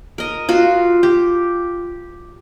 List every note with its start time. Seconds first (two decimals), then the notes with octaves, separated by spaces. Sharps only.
0.18 A#4 D#5
0.49 F4 F#4
1.03 G4